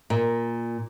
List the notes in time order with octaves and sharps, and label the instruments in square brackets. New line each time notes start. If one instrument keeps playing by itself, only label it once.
[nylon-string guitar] A#2